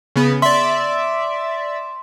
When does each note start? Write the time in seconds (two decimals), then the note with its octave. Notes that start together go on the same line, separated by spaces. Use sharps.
0.16 C#3 B3
0.42 D5 E5 C6